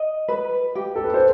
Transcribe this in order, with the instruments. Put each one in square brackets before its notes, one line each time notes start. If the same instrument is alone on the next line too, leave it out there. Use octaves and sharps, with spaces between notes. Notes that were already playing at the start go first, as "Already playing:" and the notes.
Already playing: [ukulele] D#5
B4
G4
[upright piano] A4
B4
C5